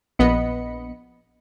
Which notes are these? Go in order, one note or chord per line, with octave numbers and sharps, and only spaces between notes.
A#1 B3 D#5 B5 C#7